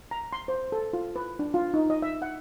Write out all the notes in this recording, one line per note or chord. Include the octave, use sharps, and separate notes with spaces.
A#5
C6
C5
A4
F4
B4
D4
F4
D#4
D#5
E5
F#5